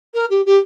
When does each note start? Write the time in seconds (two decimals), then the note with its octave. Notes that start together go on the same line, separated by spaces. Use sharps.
0.14 A#4
0.30 G4
0.46 G4